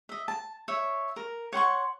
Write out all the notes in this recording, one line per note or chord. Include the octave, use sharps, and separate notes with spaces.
D#5 E5
A5
C#5 E5
A#4
C#5 F#5 C6 C#6